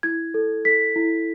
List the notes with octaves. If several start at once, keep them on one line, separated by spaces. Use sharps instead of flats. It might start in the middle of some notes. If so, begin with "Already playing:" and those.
E4 G#6
A4
A4 B6
E4